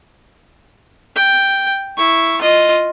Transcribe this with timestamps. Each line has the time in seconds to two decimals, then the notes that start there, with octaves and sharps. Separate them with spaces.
1.15 G5
1.97 E4 C#6
2.41 F4 D#5